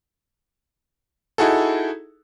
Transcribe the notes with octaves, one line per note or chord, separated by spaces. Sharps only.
D#4 E4 F#4 G#4 A4